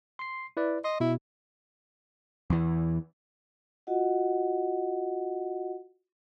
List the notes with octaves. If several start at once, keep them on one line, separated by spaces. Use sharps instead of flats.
C6 C7
E4 B4 D5
D#5 C6
B2 E4
E2 E3
F4 F#4 D#5 F#5